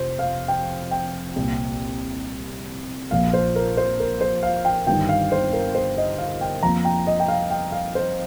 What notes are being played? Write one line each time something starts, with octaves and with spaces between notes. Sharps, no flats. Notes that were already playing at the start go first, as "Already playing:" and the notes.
Already playing: F1 F2 C3 F3 C5
F5
G5
G5
C2 A#2 A#3
A#1 A#2 F3 A#3 F5
C5
A#4
C5
A#4
C5
F5
G5
G1 G2 D#3 G5
F5
C5
A#4
C5
D#5
F5
G5
F2 F3 A#3 A#5
G5
D#5
G5
F5
G5
F5
C5